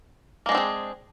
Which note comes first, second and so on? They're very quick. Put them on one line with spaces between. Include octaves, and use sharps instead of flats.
A#3 G#3 D4 C4 G#4